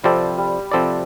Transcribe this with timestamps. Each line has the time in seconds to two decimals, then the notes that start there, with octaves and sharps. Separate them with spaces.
0.03 C3 F3 G3 C4 A4 D5
0.38 G3
0.71 C3 F3 C4 A4 D5